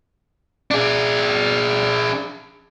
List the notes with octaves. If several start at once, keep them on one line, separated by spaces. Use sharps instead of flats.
D4 G#4